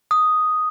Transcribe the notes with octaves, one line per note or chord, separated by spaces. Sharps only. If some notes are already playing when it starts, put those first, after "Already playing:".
D#6